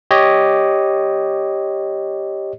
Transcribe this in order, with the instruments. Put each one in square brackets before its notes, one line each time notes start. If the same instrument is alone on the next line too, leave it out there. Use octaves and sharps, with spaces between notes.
[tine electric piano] G4 C#5 D#5